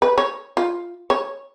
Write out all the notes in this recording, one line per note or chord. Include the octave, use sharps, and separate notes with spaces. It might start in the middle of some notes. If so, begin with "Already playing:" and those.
B4
C#5
F4
C#5